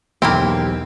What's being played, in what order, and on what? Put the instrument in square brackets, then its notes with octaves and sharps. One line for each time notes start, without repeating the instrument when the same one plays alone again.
[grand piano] B1 E2 [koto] A#3 E4 G5 [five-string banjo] C4 [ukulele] G4